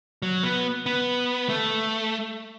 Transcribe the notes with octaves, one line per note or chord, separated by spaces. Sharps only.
F#3
B3
B3
A3